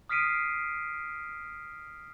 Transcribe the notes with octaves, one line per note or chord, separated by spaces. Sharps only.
D#6 F6 B6 C7 D7 D#7